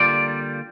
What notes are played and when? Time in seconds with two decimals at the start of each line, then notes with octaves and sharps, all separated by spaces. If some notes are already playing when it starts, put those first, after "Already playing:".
Already playing: D3 G3 A#3 F4 D5